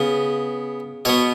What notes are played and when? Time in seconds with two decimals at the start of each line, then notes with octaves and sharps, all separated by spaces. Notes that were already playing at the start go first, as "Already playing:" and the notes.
Already playing: C#3 B3
1.05 B2 B3 C#5